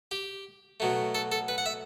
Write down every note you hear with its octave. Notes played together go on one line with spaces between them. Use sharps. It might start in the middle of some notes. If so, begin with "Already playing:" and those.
G4
B2 F#3 A3
A4
A4
B4
F#5
E5